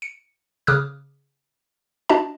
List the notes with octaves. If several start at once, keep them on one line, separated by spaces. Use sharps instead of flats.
C#7
C#3 D6 D#6 F6 F#6
D4 F#4 D#5 A5